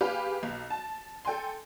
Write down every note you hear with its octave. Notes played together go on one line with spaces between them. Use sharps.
G4 G#4 B4 F5
B1
A5
A4 G5 G#5 C6